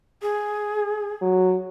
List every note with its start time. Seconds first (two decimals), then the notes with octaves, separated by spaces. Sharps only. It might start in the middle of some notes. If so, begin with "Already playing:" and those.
0.22 G#4
1.22 F#3